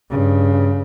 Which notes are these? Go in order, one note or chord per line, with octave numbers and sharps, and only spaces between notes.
G2 C#3